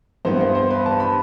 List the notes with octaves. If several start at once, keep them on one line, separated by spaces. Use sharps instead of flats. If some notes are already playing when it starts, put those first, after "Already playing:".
G2 E3 B3 C5
C5
C5
B4
A5
B5